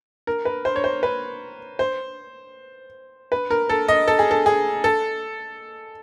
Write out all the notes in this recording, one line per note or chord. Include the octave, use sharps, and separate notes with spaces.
A#4
B4
C5
C#5
C5
B4
C5
B4
A#4
A4
D#5
A4
G#4
A4
G#4
A4